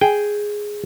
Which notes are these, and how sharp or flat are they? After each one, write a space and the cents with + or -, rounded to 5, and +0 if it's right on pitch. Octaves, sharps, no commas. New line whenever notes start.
G#4 +0 G5 +0